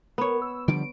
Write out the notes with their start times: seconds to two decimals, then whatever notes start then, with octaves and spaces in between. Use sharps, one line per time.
0.18 B3 A#4 C#5
0.42 E6
0.68 D3 F3 G3 D7